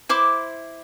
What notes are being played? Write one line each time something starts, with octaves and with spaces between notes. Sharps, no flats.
E4 C5 D6